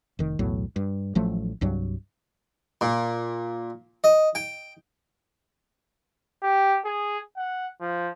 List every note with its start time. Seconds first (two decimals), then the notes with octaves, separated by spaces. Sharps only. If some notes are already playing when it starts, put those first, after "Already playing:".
0.19 F1 D#3
0.39 B1 E2 A2 F#3
0.76 G2
1.15 A1 F3 F#3 A3
1.61 C2 G2 F#3
2.81 A#2
4.04 D#5
4.35 G5
6.43 G4
6.85 G#4
7.37 F#5
7.81 F3